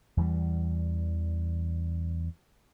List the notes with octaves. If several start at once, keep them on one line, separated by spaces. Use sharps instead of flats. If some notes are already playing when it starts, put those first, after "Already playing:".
E2 E3 G3